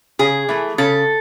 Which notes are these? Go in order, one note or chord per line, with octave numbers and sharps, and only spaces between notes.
C#3 G#4
E3 A3
C#3 A4